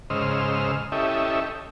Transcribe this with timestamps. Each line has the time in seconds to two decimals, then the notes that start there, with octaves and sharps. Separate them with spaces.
0.10 G#2 C#3 C5 D#5 E6 F6
0.92 C#4 E4 G4 A4 D#5 E5